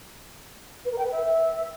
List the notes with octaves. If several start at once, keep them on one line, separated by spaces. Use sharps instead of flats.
B4
A#4
G5
B4
E5